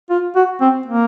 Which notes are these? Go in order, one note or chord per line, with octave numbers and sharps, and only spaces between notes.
F4
F#4
C4
A#3